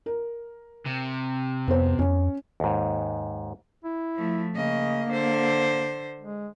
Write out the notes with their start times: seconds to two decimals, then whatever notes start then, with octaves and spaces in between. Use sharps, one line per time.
0.06 A#4
0.86 C3
1.68 F2 B3 C5
1.99 F2 C#4
2.60 D#2 G#2
3.84 E4
4.16 F3 A3
4.54 C#3 A#3 D#5
5.09 D3 C5
6.21 G#3